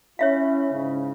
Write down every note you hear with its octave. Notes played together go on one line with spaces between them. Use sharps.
C#4 E4 C#5 E5 F5
G#2 C#3